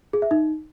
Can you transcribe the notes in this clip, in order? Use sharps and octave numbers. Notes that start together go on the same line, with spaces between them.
G#4
E5
D#4